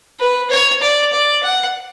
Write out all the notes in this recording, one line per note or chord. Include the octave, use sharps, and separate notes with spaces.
B4
C#5
D5
D5
F#5